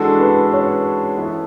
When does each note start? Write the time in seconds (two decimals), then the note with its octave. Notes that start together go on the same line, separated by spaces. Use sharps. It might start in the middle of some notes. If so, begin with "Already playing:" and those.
Already playing: E3 G#3 D4 F#4 A4
0.20 B4
0.53 C#5
1.17 E3 B3 E4